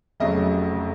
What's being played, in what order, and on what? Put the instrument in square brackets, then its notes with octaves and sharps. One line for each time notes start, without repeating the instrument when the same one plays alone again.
[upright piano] F1 F2 C#3 F#3 A3 D#5